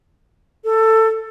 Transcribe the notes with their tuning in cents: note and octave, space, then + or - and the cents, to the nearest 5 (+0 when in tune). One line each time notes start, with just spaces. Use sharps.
A4 +15